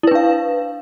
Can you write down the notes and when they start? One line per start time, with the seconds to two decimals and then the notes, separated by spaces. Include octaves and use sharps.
0.03 E4
0.07 B4
0.11 D4
0.15 F5